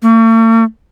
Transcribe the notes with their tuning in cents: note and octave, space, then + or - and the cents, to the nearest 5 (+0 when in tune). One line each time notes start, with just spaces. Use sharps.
A3 +45